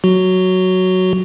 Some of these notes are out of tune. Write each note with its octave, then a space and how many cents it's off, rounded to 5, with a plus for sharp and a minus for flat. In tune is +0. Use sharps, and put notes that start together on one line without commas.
F#3 +0 F#4 +5